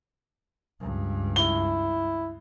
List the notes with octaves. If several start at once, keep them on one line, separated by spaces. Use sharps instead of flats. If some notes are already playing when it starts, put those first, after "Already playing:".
C#2 G2
E4 G7